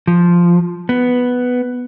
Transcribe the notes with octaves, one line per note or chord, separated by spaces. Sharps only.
F3
B3